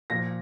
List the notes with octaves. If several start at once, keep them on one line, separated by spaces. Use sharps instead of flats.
A#2 F3 A#6